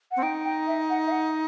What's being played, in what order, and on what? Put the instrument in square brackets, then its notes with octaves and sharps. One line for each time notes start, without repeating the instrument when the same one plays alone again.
[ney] F#5
[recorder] C4
[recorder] D#4 [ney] G5
[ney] G5
E5
F#5
E5
F#5